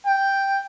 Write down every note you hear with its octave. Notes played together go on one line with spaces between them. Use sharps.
G5